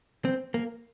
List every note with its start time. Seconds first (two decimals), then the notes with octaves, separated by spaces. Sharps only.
0.25 C4
0.54 A#3